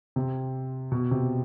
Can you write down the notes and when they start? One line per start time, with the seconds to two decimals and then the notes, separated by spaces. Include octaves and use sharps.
0.16 C3
0.92 B2
1.11 C3